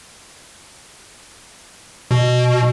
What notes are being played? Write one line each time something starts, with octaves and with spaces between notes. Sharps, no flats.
B2